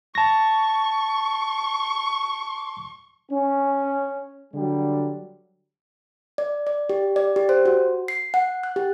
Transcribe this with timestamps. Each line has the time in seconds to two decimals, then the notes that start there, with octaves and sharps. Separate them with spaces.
0.15 A5 C#6 A#6
3.31 C#4
4.54 D3 F#3 G3
6.38 D5
6.67 D5
6.90 G4
7.16 D5
7.36 G4
7.49 C5
7.65 F#4
8.08 C7
8.34 F#5
8.63 F#6
8.76 G4